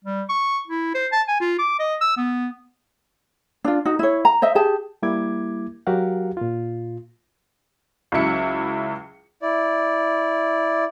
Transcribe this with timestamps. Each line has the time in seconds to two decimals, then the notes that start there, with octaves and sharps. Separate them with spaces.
0.05 G3
0.29 C#6
0.68 E4
0.95 C5
1.12 A5
1.28 G#5
1.41 F4
1.59 D6
1.80 D#5
2.01 E6
2.17 B3
3.64 D4 F4
3.85 D#4 F#4
3.99 E4 C#5
4.25 A#5
4.42 C5 D#5 E5
4.55 G4 G#4 A5
5.03 G3 A#3 E4 D6 G#6
5.87 F#3 F#4 G4 A#4 F5 F#5
6.37 A#2 F4
8.12 C#2 C#3 F#3 E4 C#7
9.42 E4 D5